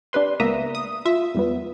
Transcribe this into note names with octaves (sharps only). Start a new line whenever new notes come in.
D4 G4 B4 C6
C#2 A#3 B3 E5 A#5 D#6
D#6
F4 E5
E2 G3 B3